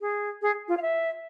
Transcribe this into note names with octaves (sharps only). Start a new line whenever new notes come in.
G#4
G#4
F4
F5
E5